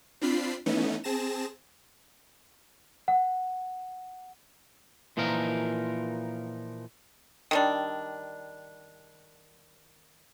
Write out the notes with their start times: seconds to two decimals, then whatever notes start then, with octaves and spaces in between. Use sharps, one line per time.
0.21 C4 D4 F4 B5 C7
0.66 E3 A3 B3 C#4 D#4
1.04 C4 G#4 A5 A#6 E7
3.08 F#5
5.17 A#2 E3 F3 D#4 A#4
7.51 D#3 G3 D4